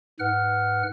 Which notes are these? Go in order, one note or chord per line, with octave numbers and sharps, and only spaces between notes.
G#2 B4 F#5 F6